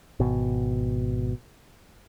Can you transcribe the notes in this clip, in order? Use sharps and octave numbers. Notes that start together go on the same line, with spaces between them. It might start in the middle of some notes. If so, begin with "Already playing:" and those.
G#1 B2